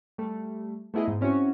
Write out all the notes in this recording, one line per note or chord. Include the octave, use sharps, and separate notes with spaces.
G3 A3
A3 B3 E4 G#4 D#5
G#2
C4 C#4 E4 F#4 C#5